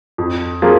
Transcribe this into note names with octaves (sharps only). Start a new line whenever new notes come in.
F2
F3 A#3 F4 G#4